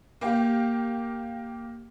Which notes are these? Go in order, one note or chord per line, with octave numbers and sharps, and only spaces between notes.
A#3 G4